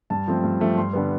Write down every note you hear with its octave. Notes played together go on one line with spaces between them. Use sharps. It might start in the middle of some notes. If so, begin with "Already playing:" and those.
G2 A5
F3 A3 C4
G2
F3 A3 C4
G2 C6
D3 G3 B3